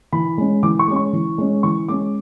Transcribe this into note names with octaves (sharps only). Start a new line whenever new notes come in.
E3 B5
G#3 C#4
E3 D6
C#6
G#3 C#4
C#6
E3
G#3 C#4
E3 C#6
G#3 C#4 D6